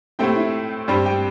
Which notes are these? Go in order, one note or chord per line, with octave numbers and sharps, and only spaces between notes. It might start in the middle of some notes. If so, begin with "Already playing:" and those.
A2 A3 C4 G4 G5
E4 E5
G2 G3 C4 G4 G5
G4 G5